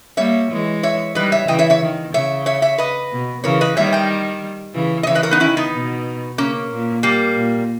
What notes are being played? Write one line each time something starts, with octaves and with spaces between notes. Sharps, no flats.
G3 A#3 C#5 E5
E3 G#3
C#5 E5
D#3 G3 B4 D#5
C#5 E5
C#3 E3 D#5 G5
C#5 E5
C#5 E5
D#3
C#3 C#5 E5
C#5 E5
C#5 E5
B4 D#5
B2
C#3 E3 A#4 C#5
B4 D#5
D#3 G3 C#5 E5
D#5 G5
C#3 E3
D#5
C#3 E3 C#5 E5
B4 D#5
A#4 C#5
B3 D#4
D#3 C#4 E4
B3 D#4
B2
C#3 A#3 C#4
A#2
G3 A#3
A#2